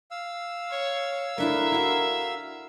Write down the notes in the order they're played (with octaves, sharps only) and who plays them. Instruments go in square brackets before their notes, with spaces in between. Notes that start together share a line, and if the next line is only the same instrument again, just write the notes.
[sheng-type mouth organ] F5 E6
[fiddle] C#5
[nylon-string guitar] A3 D4 E4 [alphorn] A#4 [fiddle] E5
[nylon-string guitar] E4 F#4